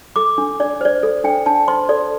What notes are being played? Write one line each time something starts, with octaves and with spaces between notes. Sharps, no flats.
A4 D6
D4
D4 D5
C5 D5
A4
D4 G5
D4 A5
C5 C6
A4 D5